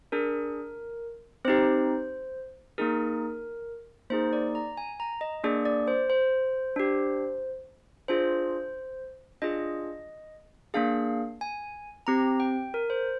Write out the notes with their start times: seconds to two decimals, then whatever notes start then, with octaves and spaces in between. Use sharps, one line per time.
0.12 D4 G#4 A#4
1.45 C4 D#4 G4 C5
2.78 A#3 D#4 G#4 A#4
4.10 A#3 D#4 G#4 C5
4.33 D5
4.55 A#5
4.77 G#5
5.00 A#5
5.21 D#5
5.44 A#3 D4 G#4 D5
5.65 D5
5.88 C5
6.10 C5
6.76 D4 G4
8.08 D4 F4 G#4 C5
9.42 D4 F4 G#4 D#5
10.74 A#3 D4 G#4 F5
11.41 G#5
12.07 C4 G4 A#5
12.40 G5
12.74 A#4
12.90 C5